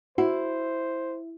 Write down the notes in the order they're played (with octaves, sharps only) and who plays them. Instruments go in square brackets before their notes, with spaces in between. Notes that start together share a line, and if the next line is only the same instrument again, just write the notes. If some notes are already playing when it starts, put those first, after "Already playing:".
[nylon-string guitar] E4 [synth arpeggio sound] F#4 [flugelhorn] C5